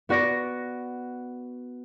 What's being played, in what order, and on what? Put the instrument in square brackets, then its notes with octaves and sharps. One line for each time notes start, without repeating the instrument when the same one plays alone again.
[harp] B3 F#4 D5 A#6 D7